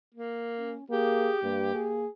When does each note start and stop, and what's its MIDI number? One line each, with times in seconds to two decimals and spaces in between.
0.15 0.76 58
0.58 0.84 61
0.90 1.29 58
0.90 2.00 67
0.90 1.39 68
1.43 1.70 43
1.43 2.05 58
1.75 2.07 68